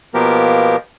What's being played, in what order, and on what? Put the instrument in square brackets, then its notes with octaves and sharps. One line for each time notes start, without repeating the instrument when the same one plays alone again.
[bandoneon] B2 F3 A#3 B3 G4 A#4